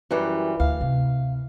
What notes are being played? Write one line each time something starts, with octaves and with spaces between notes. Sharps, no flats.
F#2 E3 G3
D2 F5
C3